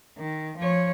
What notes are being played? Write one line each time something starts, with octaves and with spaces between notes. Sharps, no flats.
D#3
F3 C#5